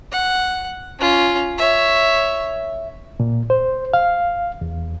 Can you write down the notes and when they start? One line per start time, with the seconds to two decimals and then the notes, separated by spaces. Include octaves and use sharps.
0.12 F#5
0.99 C#4 F4
1.58 C#5 E5
3.20 A#2
3.50 C5
3.94 F5
4.61 E2